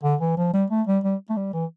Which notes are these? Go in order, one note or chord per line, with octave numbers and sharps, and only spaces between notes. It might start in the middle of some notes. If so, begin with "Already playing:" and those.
D3
E3
F3
G3
A3
G3
G3
A3
G3
E3